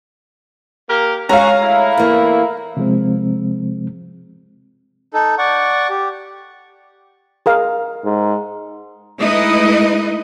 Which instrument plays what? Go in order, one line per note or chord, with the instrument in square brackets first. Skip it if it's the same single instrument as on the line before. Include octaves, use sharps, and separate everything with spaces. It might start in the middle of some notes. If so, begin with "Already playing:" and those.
[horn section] A#3 G4 A#4
[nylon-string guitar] G#3 C#5 [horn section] C#4 F#4 [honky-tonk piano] F5 A#5
[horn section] A3 E4
[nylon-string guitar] E2 A#3
[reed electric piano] C3 F3 G#3 C4
[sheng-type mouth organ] D#4 A4
D5 F#5 C#6
G4
[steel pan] G#4 A#4 F5
[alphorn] G#2
[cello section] G#3 A3 D#4 E4 B4 D#5